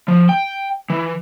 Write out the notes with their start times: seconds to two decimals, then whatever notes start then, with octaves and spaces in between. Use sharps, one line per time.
0.08 F3
0.29 G5
0.90 E3